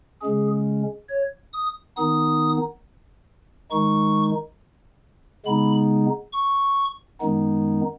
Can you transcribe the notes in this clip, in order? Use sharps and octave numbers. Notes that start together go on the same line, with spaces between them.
C#3 G#3 C#4 G#4
C#5
D#6
D#3 B3 D#4 D#6
D#3 G#3 D#4 C#6
C#3 G#3 B3 D#4 B5
C#6
F#2 D#3 G#3 B3 D#4